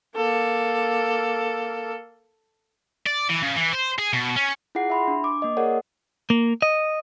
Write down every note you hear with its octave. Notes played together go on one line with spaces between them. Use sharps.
A#3 A4
D5
E3
C#3
E3
C5
G#4
B2
C#4
E4 F4 G#4 F#5 C7
E5 B5 C6
D4
D6
A#3 D#5
G#4 A#4 C#5 D5 F#5
A#3
D#5